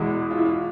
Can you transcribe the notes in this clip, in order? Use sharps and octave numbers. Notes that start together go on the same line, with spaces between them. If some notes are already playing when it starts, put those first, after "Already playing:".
Already playing: E2 B2 G#3 E4 F#4
F4
E4
F4